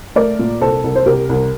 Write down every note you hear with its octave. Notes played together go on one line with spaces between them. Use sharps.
A3 A#4 D5
A#2
C2 A4 C5
C2
C5
C2 G4 A#4
C2